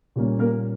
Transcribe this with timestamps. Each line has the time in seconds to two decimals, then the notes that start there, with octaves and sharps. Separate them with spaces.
0.16 A#2 G3 A#3 C#4
0.39 A#3 A#4